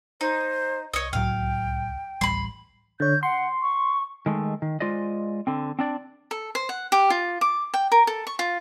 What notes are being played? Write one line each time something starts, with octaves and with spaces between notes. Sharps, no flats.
D#4 C5
C2 C#5 D#5
C#2 A2 F#3 F5 G5
A1 D2 G3 B5 C6
D3 C#5 G6
F#5 C6
C#6
D#3 G#3 A3
D#3
G#3 F4 C5 D5 D#5
D3 C4
C4 D4 D5
A4
C5
F#5
G4
F4
D6
G5
A#4
A4
C#6
F4